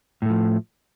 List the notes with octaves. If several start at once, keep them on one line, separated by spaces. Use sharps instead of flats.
A2 F3 A3